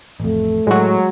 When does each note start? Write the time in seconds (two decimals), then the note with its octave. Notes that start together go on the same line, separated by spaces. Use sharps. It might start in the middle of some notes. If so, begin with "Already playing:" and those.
0.20 A1 F2 A3
0.67 A2 F#3 G#3 F#4